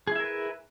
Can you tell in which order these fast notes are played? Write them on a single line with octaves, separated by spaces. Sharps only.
G#4 E4 E5 A#4 B4